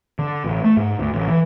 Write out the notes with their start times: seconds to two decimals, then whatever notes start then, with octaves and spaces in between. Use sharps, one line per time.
0.19 D3
0.44 A1
0.64 A3
0.77 G#2
0.99 D2
1.13 A1
1.28 E3